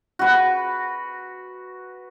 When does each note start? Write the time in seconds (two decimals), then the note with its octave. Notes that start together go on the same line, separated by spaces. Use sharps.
0.19 F#4 B4